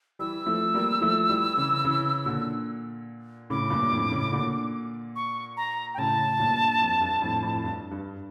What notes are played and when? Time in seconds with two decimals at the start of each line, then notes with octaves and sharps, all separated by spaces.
0.19 E3 G3 E6
0.46 F3 A3
0.74 G3 A#3
1.01 F3 A3
1.29 E3 G3
1.57 C#3 E3
1.84 C#3 E3
2.26 A#2 D3
3.50 A2 C#3 D6
3.70 G2 A#2
3.91 F2 A2
4.12 A2 C#3
4.32 A#2 D3
5.16 C#6
5.57 A#5
5.94 G5
5.98 A2 C#3 A5
6.39 G2 A#2
6.81 F2
7.01 G2
7.22 F2 A2
7.42 F2 A2
7.64 G2
7.91 G2